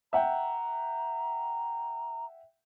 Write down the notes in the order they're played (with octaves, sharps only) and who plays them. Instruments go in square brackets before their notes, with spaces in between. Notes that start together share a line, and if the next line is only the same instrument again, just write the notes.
[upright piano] E5 F#5 G5 [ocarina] A#5